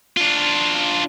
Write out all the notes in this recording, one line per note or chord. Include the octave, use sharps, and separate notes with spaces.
D4 F4